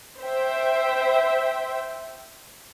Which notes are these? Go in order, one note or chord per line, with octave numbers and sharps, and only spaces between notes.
C5 E5 G5